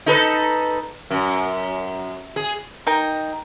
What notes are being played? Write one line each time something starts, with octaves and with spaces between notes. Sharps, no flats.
D#4 A4 B4
F#2
G#4
D#4 A#4 G5 A#5